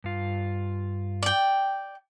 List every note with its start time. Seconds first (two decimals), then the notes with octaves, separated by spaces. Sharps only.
0.04 G2 F4
1.23 D5 G5